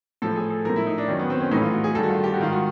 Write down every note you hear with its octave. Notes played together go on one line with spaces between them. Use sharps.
A2 F3 A4
G#4
A4
A2 F3 A#4
E4
D#4
D4
F#2 D#3 C#4
B3
C4
C#4
A2 E3 D#4
F4
F#4
G#4
G2 D#3 A4
F#4
F4
G4
F#4
G#2 D#3 F4
F#4